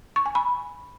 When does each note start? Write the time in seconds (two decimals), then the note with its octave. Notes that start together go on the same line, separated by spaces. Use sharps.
0.16 C#6
0.26 G#5
0.35 B5